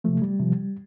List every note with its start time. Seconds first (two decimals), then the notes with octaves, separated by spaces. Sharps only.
0.04 C3 F3 A3
0.22 G3
0.39 C3 F3